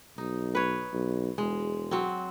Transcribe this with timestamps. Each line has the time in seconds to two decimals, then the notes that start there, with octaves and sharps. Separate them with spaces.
0.18 B1 D#4
0.55 B4 C#5
0.93 B1
1.38 E1 G#3
1.91 F#3 C4